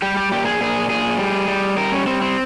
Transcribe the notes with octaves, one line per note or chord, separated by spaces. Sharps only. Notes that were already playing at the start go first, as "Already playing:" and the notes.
G3 G4
G4
A#2 G4
G#4
A#2 G#4
A#2 G#4
G3
G3
G3 A#4
C#4
G3 C4
C4